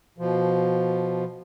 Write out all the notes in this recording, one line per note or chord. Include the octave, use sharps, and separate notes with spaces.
B2 F3